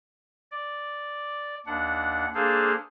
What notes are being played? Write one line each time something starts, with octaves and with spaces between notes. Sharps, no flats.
D5
D#2 D4 F#5
A#3 D4 G#4 A4 C5 F5